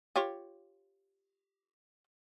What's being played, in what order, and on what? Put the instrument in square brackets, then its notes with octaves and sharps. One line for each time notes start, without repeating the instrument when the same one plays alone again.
[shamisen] F4 G4 C#5